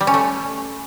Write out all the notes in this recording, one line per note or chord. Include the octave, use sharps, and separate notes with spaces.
G3
C#4
A3